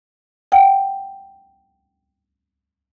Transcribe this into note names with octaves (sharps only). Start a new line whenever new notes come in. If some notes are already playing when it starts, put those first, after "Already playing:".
F#5 G5